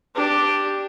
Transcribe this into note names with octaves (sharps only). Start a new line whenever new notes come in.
D4 G4